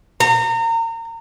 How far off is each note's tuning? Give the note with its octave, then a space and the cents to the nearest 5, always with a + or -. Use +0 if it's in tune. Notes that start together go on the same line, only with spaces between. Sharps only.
A#5 -30